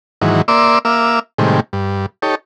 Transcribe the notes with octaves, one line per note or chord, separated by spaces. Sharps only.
G#2 D#3 E3 F#3
A#3 D5 E5 C6 D6 E6
A#3 E5 F5 D6 E6
A2 C3 D#3 G3 G#3
G2
D#4 G4 A4 C#5